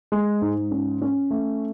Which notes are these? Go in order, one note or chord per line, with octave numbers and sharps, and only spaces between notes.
G#3
G#2
C#4
C#4
A3